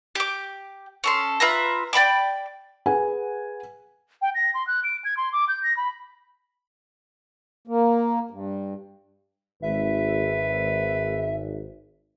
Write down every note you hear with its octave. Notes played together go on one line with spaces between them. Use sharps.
G4 D6
C#4 A4 C6
F4 B4 E5 A#5
D5 G5 B5 D6
G#4 B4 F#5 G#5
G5
A#6
C6
F#6
D7
G#6
C6
D6
G6
A#6
B5
A#3
G2
G#1 B4 E5